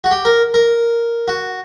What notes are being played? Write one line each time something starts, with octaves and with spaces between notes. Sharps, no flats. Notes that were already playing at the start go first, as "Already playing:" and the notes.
F#4
G4
A#4
A#4
F#4